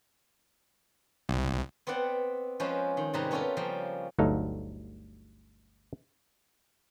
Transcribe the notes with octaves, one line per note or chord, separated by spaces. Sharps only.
C2
B3 C4 D5 F#5 G5
F3 G#3 C#4 B4 C5
D#3
G#2 C3 G3 G#4 B4 A#5
B3 C#4 F4 G4 A4 A#4
C#3 F3 G3 A#3
G1 D2 F#3 D#4 A4 F5